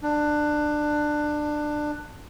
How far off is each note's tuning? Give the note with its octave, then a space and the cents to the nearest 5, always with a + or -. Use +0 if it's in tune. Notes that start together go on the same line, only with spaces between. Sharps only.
D4 +20